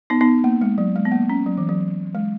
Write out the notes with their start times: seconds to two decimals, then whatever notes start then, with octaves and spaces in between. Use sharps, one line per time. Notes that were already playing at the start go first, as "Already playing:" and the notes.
0.10 B3 D#4
0.21 B3 D#4
0.44 A#3
0.61 G#3
0.78 F#3
0.96 G#3
1.05 B3
1.12 A#3
1.30 C#4
1.46 F#3
1.58 E3
1.69 F#3
2.15 G#3